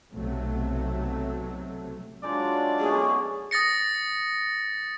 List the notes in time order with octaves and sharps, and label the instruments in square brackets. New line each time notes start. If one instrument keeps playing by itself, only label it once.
[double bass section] B1 C3 F#3 A3
[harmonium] F#3 D4 F4 [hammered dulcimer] G#3 D#4 [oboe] D5
[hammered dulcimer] B2 A3 C#4 [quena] G#4
[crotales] D#6 A6 A#6 C#7